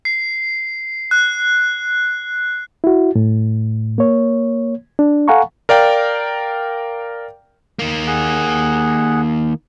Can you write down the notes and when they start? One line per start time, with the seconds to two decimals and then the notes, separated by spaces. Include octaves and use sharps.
0.05 C7
1.11 F#6
2.84 E4 F#4
3.15 A2
3.98 A#3 C#5
4.99 D4
5.28 A4 F5 F#5 G#5 A#5 C#6
5.69 A#4 D5 F5 G5
7.79 D#3 A#3
8.07 G#4 F#5